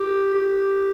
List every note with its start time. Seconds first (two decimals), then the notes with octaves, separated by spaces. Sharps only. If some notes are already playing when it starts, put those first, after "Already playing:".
Already playing: G4
0.34 G4